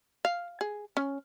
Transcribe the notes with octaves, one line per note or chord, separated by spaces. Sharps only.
F5
G#4
C#4